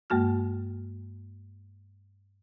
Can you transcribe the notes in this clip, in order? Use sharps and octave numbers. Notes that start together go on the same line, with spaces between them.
G2 G#3 A#3 F#4 F6